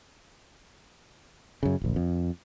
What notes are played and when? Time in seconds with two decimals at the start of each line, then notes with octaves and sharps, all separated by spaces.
1.63 F#2 C#3
1.81 D1 A#1
1.96 F2